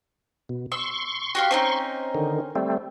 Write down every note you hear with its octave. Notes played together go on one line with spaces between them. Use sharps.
B2
C6 C#6 E6
F#4 G4 F5
C4 C#4 D#4
D3 D#3
G3 A3 C4